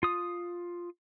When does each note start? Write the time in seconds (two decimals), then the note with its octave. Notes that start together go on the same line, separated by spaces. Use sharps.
0.03 F4 D#6